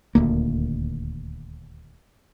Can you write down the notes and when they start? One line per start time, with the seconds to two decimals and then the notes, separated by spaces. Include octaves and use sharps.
0.15 D#1 D2 A#3